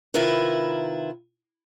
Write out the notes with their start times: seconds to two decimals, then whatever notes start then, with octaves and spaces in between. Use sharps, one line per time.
0.14 C3 D#3 E4 F4 A#4 B4